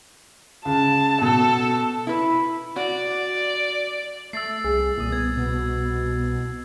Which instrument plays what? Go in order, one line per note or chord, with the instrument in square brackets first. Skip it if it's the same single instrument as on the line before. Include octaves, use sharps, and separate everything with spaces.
[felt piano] C#2 [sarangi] A5
[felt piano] B2 [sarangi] A4
[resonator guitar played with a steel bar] E4 B4
[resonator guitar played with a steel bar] F#4 [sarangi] D5
[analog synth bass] A3 [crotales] E6 A6 C7
[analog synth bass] C2 [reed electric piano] G#4
[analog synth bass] C2 [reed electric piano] A#2 D#6
[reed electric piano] B3 [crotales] G#6
[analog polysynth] B2